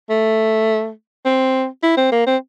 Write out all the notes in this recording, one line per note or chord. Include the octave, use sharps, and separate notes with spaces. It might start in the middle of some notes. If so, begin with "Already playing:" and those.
A3
C4
E4
C4
A#3
C4